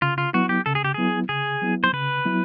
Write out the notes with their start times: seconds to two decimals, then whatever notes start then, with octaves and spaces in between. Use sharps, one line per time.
0.02 C#3 F4
0.18 F4
0.33 F#3 B3 E4 F#4
0.49 G4
0.66 C#3 A4
0.75 G#4
0.84 G4
0.94 F#3 B3 E4 G#4
1.29 C#3 G#4
1.62 F#3 B3 E4
1.84 C5
1.93 C#3 B4
2.25 F#3 B3 E4